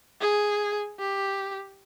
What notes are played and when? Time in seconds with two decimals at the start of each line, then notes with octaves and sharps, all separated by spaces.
0.21 G#4
0.99 G4